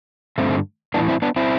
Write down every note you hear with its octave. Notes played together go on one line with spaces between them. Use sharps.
G2 D3 A3 C4
A2 E3 B3 D4
C4 E4
B3 D4
C4 E4